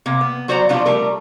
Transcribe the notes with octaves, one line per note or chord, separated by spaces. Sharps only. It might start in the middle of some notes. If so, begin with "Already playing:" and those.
C3 A#3
B3
F#3 F#4 C5 D5 F#5 A#5
B2 F3 G3 D4 F4
G3 A3 A#4